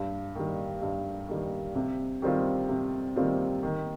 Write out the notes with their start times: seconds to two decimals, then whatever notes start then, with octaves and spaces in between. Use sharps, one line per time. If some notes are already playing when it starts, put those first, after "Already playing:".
Already playing: G2
0.35 D#3 G3
0.82 G2
1.29 D#3 G3
1.75 C3
2.22 D#3 G3 C4 F4
2.69 C3
3.16 D#3 G3 C4 F4
3.63 D#3